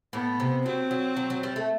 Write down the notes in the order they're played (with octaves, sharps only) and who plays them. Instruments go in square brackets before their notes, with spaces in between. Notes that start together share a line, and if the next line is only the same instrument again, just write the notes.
[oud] A2 [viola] B3
[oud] C3
[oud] F#3 [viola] C4
[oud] F#3
F#3
F#3
G3
A3